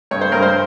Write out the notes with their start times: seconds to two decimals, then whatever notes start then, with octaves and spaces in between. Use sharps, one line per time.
0.11 G2 C#5
0.21 C5
0.32 G2 A#4
0.42 C5